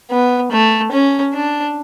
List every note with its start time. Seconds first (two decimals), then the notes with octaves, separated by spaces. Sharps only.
0.11 B3
0.52 A3
0.92 C#4
1.34 D4